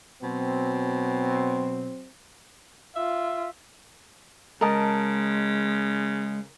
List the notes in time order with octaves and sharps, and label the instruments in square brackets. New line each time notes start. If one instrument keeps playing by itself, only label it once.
[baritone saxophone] B2 [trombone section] F#3 C4
[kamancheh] F4 [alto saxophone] E5
[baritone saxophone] C#3 [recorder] G#3 [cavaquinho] A#4 D#5 A5